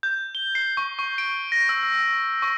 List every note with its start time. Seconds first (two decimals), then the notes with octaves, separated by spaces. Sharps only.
0.03 G6
0.35 G7
0.55 C7
0.77 C#6
0.99 C#6
1.18 D7
1.52 A#6
1.69 E6
1.83 E6
2.42 C#6